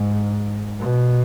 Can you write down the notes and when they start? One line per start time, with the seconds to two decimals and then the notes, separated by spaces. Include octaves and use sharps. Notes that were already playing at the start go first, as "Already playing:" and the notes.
Already playing: G#2
0.80 B2